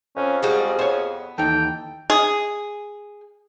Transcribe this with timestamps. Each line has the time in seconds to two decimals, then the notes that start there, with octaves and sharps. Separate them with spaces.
0.16 F2 C#4
0.43 G3 G#3 F#4 G#4
0.79 B3 C5 C#5
1.38 D#2 E3 D#4 A4 G5
2.10 G#4